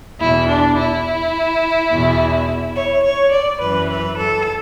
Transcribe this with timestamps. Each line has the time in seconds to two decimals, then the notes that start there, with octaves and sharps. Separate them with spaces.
0.20 E2 B2 E4
0.48 D4
0.78 E4
1.91 E2 B2
2.76 C#5
3.04 C#5
3.32 D5
3.61 F#2 E3 B4
3.90 B4
4.17 A4